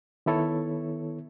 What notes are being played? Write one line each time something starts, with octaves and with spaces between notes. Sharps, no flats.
D#3 B3 E4 A4 C#5